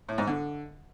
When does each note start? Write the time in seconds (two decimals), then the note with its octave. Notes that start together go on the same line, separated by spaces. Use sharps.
0.09 A2
0.18 G#2
0.27 D3